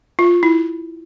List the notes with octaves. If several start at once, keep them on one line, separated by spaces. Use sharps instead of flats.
F4
E4